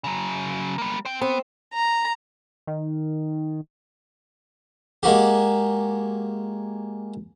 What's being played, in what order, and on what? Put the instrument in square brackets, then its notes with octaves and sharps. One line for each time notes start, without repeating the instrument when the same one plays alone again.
[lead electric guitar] C#3 F#3
G3 A#3
C5 G5
[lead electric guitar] B3 [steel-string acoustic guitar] C4
[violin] A#5
[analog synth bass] D#3
[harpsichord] G#3 A#3 F#4 G4